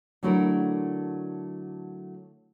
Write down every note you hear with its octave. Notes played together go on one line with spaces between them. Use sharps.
D3 F#3 A3 E4 A4 A#4